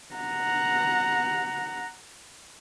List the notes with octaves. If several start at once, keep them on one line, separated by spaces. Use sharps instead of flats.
F#5 A#5